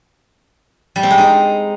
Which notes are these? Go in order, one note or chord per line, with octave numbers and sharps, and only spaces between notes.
G3
C4
G#3
D#4